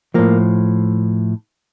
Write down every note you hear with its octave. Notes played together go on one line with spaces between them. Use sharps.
A2 F3 A#3